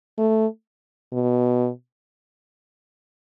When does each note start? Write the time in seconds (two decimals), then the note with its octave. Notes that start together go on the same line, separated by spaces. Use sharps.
0.18 A3
1.12 B2